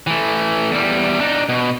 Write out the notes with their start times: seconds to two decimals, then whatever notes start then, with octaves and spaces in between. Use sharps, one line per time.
0.07 E3 A3
0.71 E2 G3
1.21 D4 D#4
1.49 B2